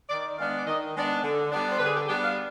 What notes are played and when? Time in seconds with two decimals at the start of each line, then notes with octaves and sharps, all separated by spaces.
0.09 D#3 D5
0.38 G#3 B3 D4 F5
0.58 D5
0.66 D#3 D#5
0.95 G#3 B3 D4
1.23 D3
1.52 G3 B3 D4
1.71 C5
1.78 D3 B4
1.86 G#4
1.94 G4
2.08 G3 B3 D4 G4
2.22 F5